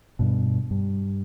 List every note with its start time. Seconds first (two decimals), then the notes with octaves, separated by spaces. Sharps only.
0.19 G2 B2
0.71 G2